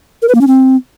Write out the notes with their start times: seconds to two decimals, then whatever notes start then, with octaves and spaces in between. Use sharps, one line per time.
0.22 A#4
0.28 B4
0.35 A#3
0.41 C#4
0.47 C4